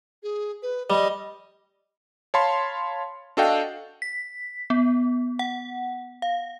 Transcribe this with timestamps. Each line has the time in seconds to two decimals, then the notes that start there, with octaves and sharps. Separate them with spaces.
0.23 G#4
0.63 B4
0.90 G3 D#5
2.34 C#5 F5 A5 B5 C6
3.37 D4 F#4 A4 D#5 F5 G5
4.02 B6
4.70 B3
5.39 F#5
6.22 F5